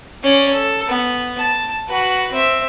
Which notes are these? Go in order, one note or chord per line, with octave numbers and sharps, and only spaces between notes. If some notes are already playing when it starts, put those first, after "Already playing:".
C#4 D5
A4
B3
A5
F#4 B4
C4 E5